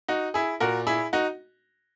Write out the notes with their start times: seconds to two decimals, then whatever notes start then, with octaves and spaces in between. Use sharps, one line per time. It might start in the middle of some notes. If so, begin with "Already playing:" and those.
0.08 D#4 F#4
0.34 E4 G#4
0.60 A#2 F#4 A#4
0.87 E4 G#4
1.13 D#4 F#4